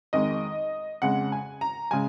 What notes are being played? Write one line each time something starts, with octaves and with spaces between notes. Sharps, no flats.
F2 D#3 G#3 D#5
F2 C#3 G#3 F#5
G#5
A#5
C#3 G#3 G#5